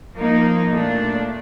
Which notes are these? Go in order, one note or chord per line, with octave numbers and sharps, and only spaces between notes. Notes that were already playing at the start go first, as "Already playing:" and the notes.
F3 A#3 D#4
A#2 A3 D4